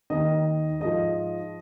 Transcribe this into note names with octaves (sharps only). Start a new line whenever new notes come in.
D#2 D#3 D#5
G#2 F3 D#5